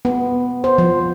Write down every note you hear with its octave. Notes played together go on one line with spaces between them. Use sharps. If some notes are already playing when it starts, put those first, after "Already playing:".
B3
C5
F3